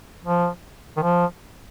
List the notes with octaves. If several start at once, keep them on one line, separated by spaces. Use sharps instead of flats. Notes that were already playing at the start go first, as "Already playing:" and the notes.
F3
D#3
F3